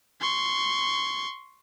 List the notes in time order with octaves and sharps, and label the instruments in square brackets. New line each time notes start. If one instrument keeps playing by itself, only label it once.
[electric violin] C6 C#6